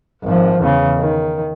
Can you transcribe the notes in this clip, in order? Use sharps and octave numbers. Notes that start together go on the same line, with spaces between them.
G#1 F3
E2 C#3
D#3